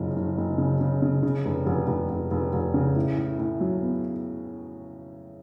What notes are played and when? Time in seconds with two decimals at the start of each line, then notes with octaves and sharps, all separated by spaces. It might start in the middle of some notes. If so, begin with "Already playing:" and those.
Already playing: F#1 F2 C#3
0.16 F#1
0.38 F#1
0.58 C#3
0.81 C#3
1.02 C#3
1.23 C#3
1.45 F1
1.66 F1
1.87 F1
2.09 F1
2.31 F1
2.53 F1
2.74 C#3
2.96 A2
3.17 A2
3.39 A2
3.61 F#3
3.82 B3